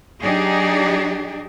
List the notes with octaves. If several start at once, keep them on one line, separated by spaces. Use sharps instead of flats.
F#3 D4 D#4 G4 G#4